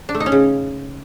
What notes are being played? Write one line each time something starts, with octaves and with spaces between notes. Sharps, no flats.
D4
A3
D#4
C#4
C#3